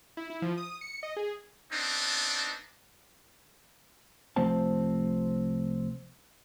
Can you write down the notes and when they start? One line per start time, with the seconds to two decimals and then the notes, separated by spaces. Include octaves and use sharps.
0.17 E4
0.30 E4
0.42 F3
0.57 D#6
0.81 C#7
1.03 D#5
1.16 G#4
1.72 B3 C4 D4 D#4
4.36 C2 F3 A3 C4 C5 A5